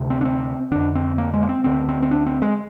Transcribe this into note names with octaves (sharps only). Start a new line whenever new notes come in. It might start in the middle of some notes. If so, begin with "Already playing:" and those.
Already playing: D2 C3
C4
D4
C4
F2 D3 D4
C4
A#3
G#3
A#3
C4
D2 D3 C4
C4
C4
D4
C4
G#3